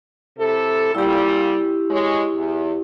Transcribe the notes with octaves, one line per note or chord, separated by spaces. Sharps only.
C3 E4 A4
A#2 G3 E4 G4
G#3 C#5
E2